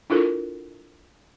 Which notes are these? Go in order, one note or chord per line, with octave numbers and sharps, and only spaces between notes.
D4 E4 F4 A4 A#4